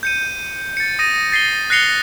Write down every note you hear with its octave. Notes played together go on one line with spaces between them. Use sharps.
G6 C#7 D#7
A6 C#7
D#6 A#6 D#7
A6 C7 D#7 G7
F#6 A#6 C7 C#7 F7 G7